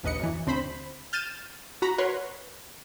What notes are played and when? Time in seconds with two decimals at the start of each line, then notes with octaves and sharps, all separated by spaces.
0.03 A#1 D#2 B4 D#5 C#7
0.20 F#2 E3
0.47 D2 C4 C5 B5
1.13 F6 G6 A6 D#7 E7
1.82 F#4 A#5 B5 A#6
1.98 A#4 B4 C#5 F#5 C6